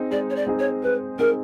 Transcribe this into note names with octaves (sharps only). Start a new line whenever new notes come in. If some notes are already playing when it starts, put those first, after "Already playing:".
Already playing: C4 D#4 G#4
G#3 D5
C#5
D5
C4 D#4 G#4
C#5
G#3 B4
C4 D#4 G#4 A#4